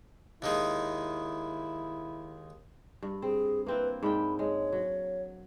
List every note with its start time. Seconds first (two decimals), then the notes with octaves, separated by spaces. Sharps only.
0.42 D#2 D#3 G#3 E4
3.02 G2
3.22 C4 G#4
3.66 A#3 C4 E4 B4
4.03 G#2 D4 G5 B5
4.39 G#3 C#5
4.72 F#3